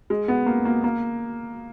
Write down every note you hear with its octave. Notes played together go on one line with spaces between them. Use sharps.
G#3
B3
A#3
A#3
A#3